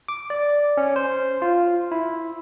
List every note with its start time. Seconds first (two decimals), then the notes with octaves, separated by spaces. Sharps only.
0.08 D6
0.30 D5
0.77 C#4
0.96 C5
1.42 F4
1.91 E4